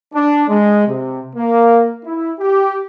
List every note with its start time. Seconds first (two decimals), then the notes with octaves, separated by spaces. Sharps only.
0.13 D4
0.49 G#3
0.86 C3
1.36 A#3
2.05 E4
2.39 G4